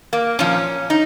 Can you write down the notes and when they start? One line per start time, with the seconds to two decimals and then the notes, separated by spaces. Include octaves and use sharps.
0.13 A#3
0.39 A#2 F3 C#4
0.90 D#4